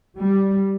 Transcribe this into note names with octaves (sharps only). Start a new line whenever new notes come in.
G3